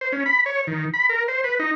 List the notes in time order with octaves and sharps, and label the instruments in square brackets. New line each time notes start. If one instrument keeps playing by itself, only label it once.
[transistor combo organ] C5
C#4
B5
C#5
D#3
B5
A#4
C5
B4
D#4